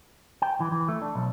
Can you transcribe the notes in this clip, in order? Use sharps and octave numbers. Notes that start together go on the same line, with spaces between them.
G5
E3
E3
A3
D4
B1